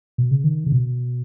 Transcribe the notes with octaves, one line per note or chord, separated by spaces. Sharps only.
B2
C#3
D#3
C#3
B2